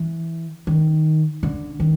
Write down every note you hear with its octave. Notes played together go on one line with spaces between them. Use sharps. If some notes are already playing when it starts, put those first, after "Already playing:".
Already playing: E3
D#3
D3
D#3